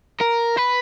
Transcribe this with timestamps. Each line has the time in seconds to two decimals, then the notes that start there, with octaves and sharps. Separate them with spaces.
0.21 A#4
0.57 B4